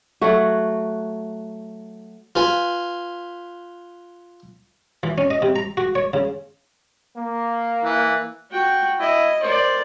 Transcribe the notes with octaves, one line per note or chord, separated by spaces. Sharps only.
F#3 A3 F#4
F4 B4 G#5
E3
C#4
D#5
C3
A#5
F#4
C#5
C#3
A#3
E3
F#4 G5
E4 D#5
A#4 C5 D5